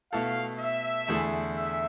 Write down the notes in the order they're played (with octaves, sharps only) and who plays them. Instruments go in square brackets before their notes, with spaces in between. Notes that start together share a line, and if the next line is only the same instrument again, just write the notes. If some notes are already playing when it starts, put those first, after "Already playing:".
[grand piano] B2 A3 E4 A4 [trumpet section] F5
[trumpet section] E5
[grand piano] E2 D3 A3 E4 G#4
[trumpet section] E5